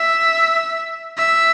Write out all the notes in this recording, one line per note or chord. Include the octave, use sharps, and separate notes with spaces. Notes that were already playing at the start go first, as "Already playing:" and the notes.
Already playing: E5
E5